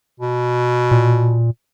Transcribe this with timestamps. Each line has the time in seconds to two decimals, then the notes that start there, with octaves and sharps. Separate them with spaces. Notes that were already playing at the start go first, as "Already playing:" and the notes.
0.20 B2
0.91 A#2